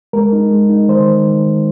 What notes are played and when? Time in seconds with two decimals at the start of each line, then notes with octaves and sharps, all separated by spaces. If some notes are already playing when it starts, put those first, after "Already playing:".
0.13 G#3 A#4
0.32 D#4
0.51 G#3
0.69 D#4
0.88 D#3 C5
1.08 D#3
1.27 D#3
1.46 D#3